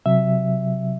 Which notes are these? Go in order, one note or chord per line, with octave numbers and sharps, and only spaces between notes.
C3 F#3 E5